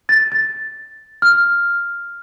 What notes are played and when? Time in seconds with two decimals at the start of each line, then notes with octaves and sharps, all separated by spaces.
0.09 A6
0.32 A6
1.22 F6